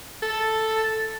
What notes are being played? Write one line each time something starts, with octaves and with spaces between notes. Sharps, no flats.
A4